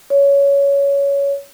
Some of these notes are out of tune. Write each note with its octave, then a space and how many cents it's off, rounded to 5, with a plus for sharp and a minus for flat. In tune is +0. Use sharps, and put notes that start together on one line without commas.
C#5 +15